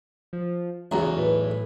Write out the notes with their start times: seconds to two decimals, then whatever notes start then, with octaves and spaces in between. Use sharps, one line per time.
0.33 F3
0.91 B1 E2 C#3 F#4 A#5
1.18 A2 B4